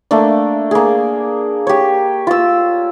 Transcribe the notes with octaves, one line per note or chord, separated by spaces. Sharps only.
A3 A#3 D4
A#3 G#4
G4 C#5
F4 E6